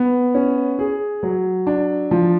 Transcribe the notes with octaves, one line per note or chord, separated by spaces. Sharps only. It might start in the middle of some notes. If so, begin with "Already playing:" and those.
Already playing: B3
C#4
G#4
F#3
D4
F3